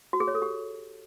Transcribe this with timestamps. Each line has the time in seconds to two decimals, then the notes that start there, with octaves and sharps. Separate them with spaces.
0.13 F#4
0.20 G#4
0.28 C#5
0.35 A4
0.42 G4